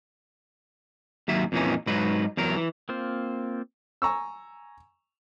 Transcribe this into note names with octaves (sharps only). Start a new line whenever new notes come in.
D#2 F#3 E5
F2 A#2 E3 C#4 D#4
G#2 F#3 D#4 B4
E2 F#3 A#4
E3
A#3 C4 F4 C5
G#5 A#5 C#6 E6